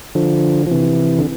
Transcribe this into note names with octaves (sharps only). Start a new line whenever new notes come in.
D3 F3
F3
C3 E3
D3